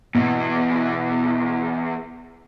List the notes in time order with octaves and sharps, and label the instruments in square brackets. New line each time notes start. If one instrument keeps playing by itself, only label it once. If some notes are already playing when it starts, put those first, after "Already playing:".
[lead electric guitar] E2 E3 [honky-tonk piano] B2